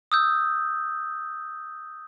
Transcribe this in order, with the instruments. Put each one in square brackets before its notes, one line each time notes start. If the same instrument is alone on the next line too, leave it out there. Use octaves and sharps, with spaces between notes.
[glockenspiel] D#6 E6 G6